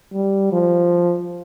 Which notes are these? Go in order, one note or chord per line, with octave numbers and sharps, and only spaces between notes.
G3
F3